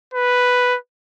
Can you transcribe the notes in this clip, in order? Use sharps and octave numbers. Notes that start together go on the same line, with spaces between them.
B4